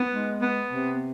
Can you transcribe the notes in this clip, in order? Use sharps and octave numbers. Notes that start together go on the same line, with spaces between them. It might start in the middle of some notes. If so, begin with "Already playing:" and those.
Already playing: B3
G#3
B3
C3